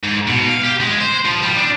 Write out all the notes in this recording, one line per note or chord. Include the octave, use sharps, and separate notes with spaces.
G#2
B2
F5
G4
G#3
C5
F3
G3
D4